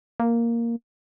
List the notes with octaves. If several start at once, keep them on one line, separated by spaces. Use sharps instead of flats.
A#3